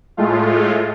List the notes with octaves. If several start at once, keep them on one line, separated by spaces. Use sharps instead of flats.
A2 G#3 A3 F4